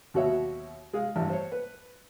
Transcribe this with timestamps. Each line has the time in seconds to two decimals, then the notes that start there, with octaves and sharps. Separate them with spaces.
0.14 D#2 B2 F#3 F#4 C#5 E5
0.93 G#3 G#4 F5
1.16 A1 G2
1.29 C5 C#5
1.52 B4